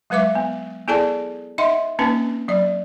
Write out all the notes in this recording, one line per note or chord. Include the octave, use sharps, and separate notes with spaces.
F#3 G#3 B4 E5 D6
B3
B3 E4 G#4 A4 D5 A5
D#4 D#5 E5 F#5 C6
A#3 C4 C#4 D#4 B4
F#3 D5